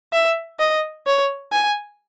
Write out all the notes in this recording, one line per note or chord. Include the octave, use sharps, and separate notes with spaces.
E5
D#5
C#5
G#5